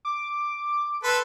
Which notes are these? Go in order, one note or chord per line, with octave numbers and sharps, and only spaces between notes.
D6
A4 B4 C6